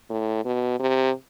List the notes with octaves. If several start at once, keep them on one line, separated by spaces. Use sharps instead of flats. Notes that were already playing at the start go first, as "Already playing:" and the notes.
A2
B2
C3